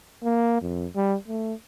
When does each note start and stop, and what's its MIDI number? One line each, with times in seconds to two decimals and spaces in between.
0.24 0.59 58
0.62 0.87 41
0.96 1.16 55
1.28 1.53 57